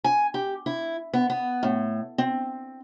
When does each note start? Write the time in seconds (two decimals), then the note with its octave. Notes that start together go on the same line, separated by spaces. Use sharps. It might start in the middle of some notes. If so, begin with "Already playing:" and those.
0.04 G#5
0.34 G4
0.66 E4
1.13 B3
1.30 B3
1.63 A2
2.18 C4